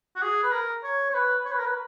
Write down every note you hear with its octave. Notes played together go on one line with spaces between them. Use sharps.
F#4
G#4
B4
A#4
C#5
C#5
B4
C#5
B4
A#4
B4